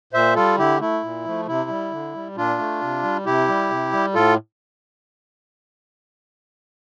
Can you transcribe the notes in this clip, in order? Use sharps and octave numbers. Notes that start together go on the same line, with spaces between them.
A#2 C5 E5
G3 F4 A4
D3 E4 G4
A3 E4
A#2
F3 A3
C3 E4
G3
D3
G3
A#2 D4 F4
A3
C3
G3
C3 E4 G4
G3
C3
G3
A2 F4 A4